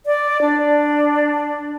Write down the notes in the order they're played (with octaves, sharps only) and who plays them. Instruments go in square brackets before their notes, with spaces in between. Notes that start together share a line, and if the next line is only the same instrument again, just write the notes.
[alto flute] D5
D4